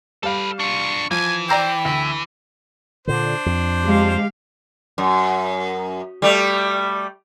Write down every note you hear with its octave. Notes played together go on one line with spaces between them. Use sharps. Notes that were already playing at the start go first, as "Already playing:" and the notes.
G3 A4 B4 F5
D4 F4 C#6
E3 F3 G#5
C5 D5 G5 A#5 E6
D2 E5
A#2 D3 D4 C5
F2
G#3 G4 F5
F#2
G3 A3